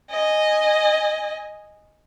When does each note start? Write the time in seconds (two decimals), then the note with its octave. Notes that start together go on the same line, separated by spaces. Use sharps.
0.12 D#5 G#5